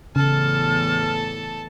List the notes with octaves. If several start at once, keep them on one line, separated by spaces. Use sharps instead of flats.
E2 A2 C#3 E3 A4 A5 F6